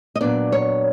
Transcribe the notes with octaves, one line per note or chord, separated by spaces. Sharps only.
D#5
A#2 F#3 B3 D4 D5
C#5